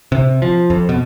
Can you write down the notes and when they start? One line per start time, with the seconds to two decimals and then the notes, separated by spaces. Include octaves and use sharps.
0.12 C3
0.42 F3
0.70 F2
0.89 B2